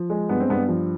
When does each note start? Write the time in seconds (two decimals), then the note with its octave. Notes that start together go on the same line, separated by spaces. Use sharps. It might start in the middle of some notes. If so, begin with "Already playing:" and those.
Already playing: F3
0.10 G#3
0.29 G2 B3
0.40 C4
0.50 G2 B3
0.69 F3